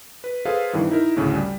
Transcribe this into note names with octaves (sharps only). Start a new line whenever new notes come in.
B4
G#4 A4 B4 C5 F5
G2 C3 D#3 E3
D#4 E4 A#4
A1 D2 A2 C#3
G3